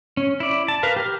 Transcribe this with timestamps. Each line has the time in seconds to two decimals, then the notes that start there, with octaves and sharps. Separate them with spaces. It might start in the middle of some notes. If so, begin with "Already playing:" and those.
0.17 C#4
0.40 E4 D5
0.68 A5
0.83 A#4 B4 F5
0.96 G4 A#4 F6